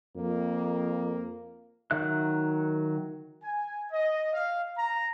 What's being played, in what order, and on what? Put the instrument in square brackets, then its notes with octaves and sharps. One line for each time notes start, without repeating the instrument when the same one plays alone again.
[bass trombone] F2 [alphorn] A#3
[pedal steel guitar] D#3 F#3 E5 F#6
[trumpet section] G#5
D#5
F5
A#5